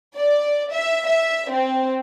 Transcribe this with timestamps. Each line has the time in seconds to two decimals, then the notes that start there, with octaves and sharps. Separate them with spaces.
0.16 D5
0.72 E5
1.07 E5
1.51 C4